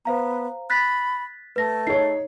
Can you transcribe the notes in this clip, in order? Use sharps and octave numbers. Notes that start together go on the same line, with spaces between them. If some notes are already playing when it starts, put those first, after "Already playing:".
B3 C5 F5 A#5
B5 F#6 A6 B6
A3 B4 A#6
D#4 G#4 C#5 C7